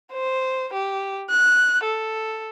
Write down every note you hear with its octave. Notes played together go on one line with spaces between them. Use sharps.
C5
G4
F#6
A4